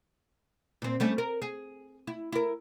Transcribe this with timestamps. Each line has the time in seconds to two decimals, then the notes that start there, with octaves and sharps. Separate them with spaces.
0.82 A#2 C4
1.00 G3 A3 C#4
1.18 A#4
1.42 G#4
2.07 E4
2.32 E4 A#4